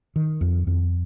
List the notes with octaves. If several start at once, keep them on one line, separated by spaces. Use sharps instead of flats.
D#3
F2
F2